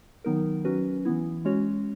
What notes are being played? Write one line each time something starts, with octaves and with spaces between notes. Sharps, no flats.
D#3 F#3 B3 D#4 A#4
F#3 C#4 F#4 B4
E3 B3 E4
G#3 C#4 F#4 C#5